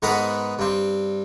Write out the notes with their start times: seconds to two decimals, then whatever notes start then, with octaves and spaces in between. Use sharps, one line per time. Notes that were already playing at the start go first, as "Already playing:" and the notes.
0.02 G#2 B3 A#4 F#5 B5 D#6
0.59 G2 C4